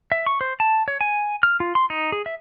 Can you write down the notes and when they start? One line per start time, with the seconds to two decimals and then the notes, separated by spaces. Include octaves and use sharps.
0.12 E5
0.26 C#6
0.41 C5
0.60 A5
0.88 C#5
1.01 G#5
1.43 F6
1.60 F4
1.75 C6
1.90 D#4
2.12 G#4
2.26 E5